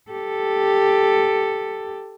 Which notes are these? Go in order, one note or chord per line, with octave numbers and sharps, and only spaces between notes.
G4 A4